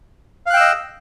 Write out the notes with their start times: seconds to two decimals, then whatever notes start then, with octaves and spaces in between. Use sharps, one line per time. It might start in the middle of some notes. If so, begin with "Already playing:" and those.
0.46 F5
0.50 F#6
0.53 G5
0.57 E6
0.60 D#5